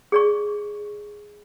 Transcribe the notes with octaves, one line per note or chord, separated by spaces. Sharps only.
G#4 D5 C#6